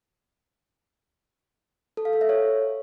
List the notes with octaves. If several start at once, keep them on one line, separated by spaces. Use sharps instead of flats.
A4
F5
A4
E5
C#5